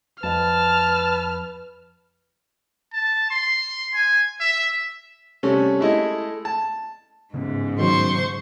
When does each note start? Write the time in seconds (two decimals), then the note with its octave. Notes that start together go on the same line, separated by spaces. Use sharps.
0.23 F2 B4 A5 F6
2.93 A5
3.31 C6
3.94 G#5
4.40 E5
5.43 C3 G3 A3 C#4
5.80 G#3 A3 E4 D#5
6.45 A5
7.34 G#2 C#3 B3 C#4
7.79 D#3 F#3 C5 C6 C#6